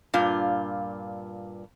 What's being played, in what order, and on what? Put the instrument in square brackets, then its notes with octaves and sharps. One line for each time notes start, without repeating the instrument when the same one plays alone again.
[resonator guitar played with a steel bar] G2 A#2 F4